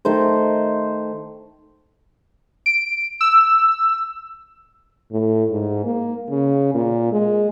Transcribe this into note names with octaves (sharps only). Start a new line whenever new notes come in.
D#3 A3 C5
D7
E6
A2
G#2
A#3
C#3
A#2
G#3